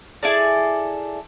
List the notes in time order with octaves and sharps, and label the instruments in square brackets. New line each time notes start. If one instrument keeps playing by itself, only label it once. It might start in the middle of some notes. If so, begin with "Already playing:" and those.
[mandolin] E4 G#4 A4 D5